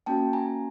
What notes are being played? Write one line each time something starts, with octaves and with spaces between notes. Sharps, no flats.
A#3 C#4 F#4 G5 A5
G#5 A#5